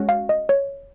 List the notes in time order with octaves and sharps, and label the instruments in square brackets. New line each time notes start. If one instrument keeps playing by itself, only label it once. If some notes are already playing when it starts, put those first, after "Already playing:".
Already playing: [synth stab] G#3 C#4 F#4
[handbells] F5
D#5
C#5